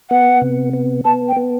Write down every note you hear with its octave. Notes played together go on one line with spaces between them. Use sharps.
B3 F#5
C3
B3
B3 A5
G5
B3